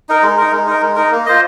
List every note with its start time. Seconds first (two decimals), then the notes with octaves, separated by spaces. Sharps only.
0.09 D#4 A#4
0.23 G#3
0.37 D#4 A#4
0.52 G#3
0.67 D#4 A#4
0.82 G#3
0.96 D#4 A#4
1.12 A#3
1.26 F4 C5 D#5